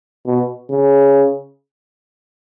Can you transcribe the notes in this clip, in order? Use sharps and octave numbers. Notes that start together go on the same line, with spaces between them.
B2
C#3